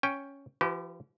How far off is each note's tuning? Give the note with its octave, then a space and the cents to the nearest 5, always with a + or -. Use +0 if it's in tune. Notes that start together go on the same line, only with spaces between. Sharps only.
C#4 +0 G5 +5
F3 -45 G4 -40 B4 +0